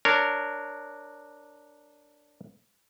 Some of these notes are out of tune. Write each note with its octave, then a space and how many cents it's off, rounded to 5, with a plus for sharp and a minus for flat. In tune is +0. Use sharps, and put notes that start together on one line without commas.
D4 +0 A#4 -15 C#5 +0